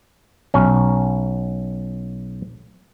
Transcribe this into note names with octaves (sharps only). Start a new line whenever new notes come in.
B1 C#4